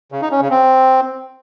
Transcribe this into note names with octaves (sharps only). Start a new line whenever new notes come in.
C#3
D#4
C#4
C#3
C4